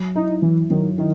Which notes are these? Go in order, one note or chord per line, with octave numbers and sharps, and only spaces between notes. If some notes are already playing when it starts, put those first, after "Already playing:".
Already playing: F#3
D#4 E4
E3 F#3
D#3 F#3
D#3 E4